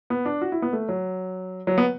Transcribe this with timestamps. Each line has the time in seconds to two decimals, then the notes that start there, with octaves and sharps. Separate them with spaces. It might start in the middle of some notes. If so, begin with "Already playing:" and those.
0.10 B3
0.25 D4
0.41 F#4
0.52 E4
0.62 B3
0.73 A3
0.89 F#3
1.67 F#3
1.78 B3